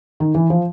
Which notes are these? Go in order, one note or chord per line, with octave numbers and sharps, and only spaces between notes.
D#3
E3
F3